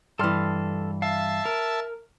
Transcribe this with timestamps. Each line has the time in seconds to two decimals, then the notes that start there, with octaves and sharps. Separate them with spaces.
0.19 G2 E3 A4 C6 F6
1.02 E5 F5 A5
1.46 A#4